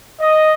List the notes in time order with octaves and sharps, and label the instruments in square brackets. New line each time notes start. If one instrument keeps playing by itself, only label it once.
[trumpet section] D#5